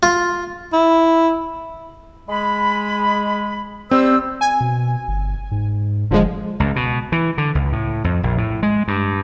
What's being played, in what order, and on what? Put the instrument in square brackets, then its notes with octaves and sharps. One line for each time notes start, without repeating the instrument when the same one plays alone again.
[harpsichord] F4
[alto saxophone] E4
[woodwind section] G#3 B5
[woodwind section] G3 C5 E6 [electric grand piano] C4
[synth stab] G#5
[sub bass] B2
G1
G#2
[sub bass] F1 [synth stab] D3 F3 G#3
[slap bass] C#2
B2
E3
D3
C#2
A2
F2
A#1
A2
G#3
G2